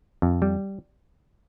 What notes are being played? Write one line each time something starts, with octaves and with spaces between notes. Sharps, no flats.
F2
G3